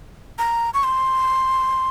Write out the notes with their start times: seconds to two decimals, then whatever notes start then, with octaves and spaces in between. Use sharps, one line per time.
0.39 A#5
0.74 C#6
0.84 C6